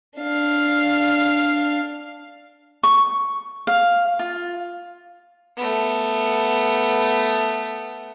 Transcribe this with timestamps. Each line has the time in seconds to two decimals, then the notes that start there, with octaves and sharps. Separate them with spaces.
0.18 D4 F5
2.83 C#6
3.67 F5
4.19 F4
5.57 A3 B3